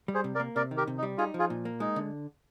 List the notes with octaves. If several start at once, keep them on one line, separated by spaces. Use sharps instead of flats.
G3
G#4 C5
C3
A#4 D5
A#3
C3 A#4 D5
D#3
G4 A#4
C3
D#4
G3
D#4 F4 G#4
F3 F4 G#4
A#2
A#3
G#3 D#4
D3